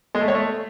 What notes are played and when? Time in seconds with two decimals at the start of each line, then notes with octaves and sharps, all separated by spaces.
0.15 G#3
0.21 A3
0.28 C#5
0.35 A3